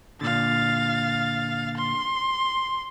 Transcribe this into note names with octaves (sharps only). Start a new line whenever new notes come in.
A#2 D3 F5 A6
C6